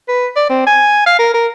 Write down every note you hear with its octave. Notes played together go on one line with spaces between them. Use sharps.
B4
D5
C4
G#5
F5
A#4
A#4